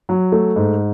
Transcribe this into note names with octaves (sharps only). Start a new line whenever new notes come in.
F#3
A3
G#2